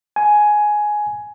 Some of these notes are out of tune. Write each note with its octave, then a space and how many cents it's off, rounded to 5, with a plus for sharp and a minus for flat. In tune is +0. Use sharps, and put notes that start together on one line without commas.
G#5 +10